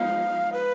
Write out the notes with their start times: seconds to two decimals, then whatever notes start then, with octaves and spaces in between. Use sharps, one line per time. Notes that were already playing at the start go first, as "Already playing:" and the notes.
Already playing: F3 G#3 B3 D#4 F5
0.53 B4